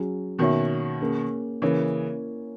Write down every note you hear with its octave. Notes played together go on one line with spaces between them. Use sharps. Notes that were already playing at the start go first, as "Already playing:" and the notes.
Already playing: F#3 C#4 G#4
B2 D#3 A#3 C#4 F#4 C#5 E5
A#3 C#4 G#4
C#3 E3 A#3 C#4 E4 A#4 C#5